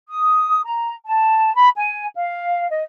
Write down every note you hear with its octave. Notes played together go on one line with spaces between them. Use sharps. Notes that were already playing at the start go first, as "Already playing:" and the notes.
D#6
A#5
A5
B5
G#5
F5
D#5